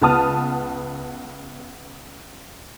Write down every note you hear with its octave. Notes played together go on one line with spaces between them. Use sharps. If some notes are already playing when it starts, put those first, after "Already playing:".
C#2 B3 A5 D#6 F6